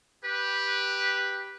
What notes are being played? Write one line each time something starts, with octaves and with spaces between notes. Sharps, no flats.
G4 B4